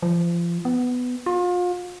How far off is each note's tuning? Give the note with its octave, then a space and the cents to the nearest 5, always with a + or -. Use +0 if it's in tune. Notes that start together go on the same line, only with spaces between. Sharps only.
F3 -30
B3 +10
F4 +35